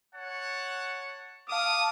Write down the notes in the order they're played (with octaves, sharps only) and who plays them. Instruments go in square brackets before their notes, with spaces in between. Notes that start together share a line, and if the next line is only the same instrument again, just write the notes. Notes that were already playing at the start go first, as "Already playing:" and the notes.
[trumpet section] C#5 F#5 A5
[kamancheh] F5 A5 [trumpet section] D6 D#6